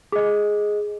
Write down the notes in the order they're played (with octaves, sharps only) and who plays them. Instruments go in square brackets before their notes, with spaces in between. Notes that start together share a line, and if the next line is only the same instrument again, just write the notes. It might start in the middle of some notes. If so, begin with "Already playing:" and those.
[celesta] G#4 D#5